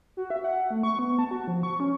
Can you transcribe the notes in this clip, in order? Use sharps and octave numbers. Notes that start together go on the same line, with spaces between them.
F#4
E5
F#5
A3
C#6
B3
A5
F#4
F3
C#6
C#4